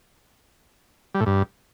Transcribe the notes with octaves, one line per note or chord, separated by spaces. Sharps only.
G3
A2
G2